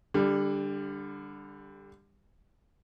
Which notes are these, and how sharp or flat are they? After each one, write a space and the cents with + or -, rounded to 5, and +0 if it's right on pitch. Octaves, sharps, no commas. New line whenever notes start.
D3 +0 G3 +20